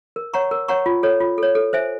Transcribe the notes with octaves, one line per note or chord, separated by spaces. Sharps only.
A#4
C#5 F#5 A#5 C#6
A#4
C#5 F#5 A#5 C#6
F4
A4 C#5
F4
A4 C#5
A4
C5 E5 G#5